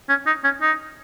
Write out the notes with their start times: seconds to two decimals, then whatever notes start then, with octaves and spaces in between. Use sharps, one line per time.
0.09 C#4
0.27 D#4
0.44 C#4
0.61 D#4